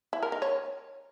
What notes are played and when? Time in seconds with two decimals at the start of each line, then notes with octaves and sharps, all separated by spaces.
0.13 E4
0.23 A#4
0.32 D#4
0.42 C#5